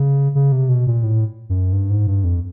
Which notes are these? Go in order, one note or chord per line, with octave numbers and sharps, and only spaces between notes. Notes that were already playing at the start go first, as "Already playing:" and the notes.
Already playing: C#3
C#3
C3
B2
A#2
A2
F#2
G2
G#2
G2
F2